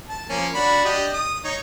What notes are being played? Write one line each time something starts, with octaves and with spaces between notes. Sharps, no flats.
A5
F3 A#3 C#4
D4 F#4 B5
D4 G4 D#5
D#6
D#4 C#5